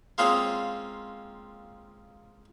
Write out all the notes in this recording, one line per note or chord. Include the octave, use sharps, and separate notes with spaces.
G#3 A#3 C4 C#4 F4 G#4